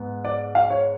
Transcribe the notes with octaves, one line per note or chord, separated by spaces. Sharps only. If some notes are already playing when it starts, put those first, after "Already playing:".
Already playing: G#2 B3
D5
F5
C#5